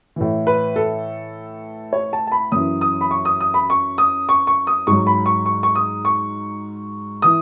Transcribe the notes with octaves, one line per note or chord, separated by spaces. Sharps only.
A2 E3
B4
A4
C#5
A5
A5
B5
F#2 E3 D#6
D#6
B5
C#6
D#6
D#6
B5
C#6
D#6
C#6
C#6
D#6
G#2 F#3 C#6
B5
C#6
C#6
C#6
D#6
C#6
E3 D#6